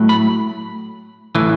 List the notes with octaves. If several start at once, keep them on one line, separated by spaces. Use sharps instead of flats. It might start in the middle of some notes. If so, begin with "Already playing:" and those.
Already playing: A2 F#3 A3
B5
A2 E3